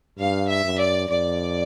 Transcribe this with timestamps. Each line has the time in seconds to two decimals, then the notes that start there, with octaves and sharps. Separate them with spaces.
0.18 G2 F5
0.48 E5
0.65 F#2
0.80 D5
1.09 F2 D5